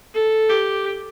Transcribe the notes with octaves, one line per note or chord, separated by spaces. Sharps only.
A4
G4